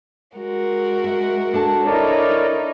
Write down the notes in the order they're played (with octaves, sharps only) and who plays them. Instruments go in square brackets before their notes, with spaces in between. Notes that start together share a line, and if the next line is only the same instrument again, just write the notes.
[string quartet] G#3 F#4 A#4
[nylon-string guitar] E5
D4 A4 A5
[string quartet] D#4 E4 C#5 [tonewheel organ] A#4 D5